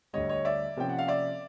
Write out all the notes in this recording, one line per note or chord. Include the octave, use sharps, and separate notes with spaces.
D2 D3 G3 C#5 D#5
C#5 D#5
D5 E5
C3 F3 A#3 C#4 G5
F#5
F5
D5 E5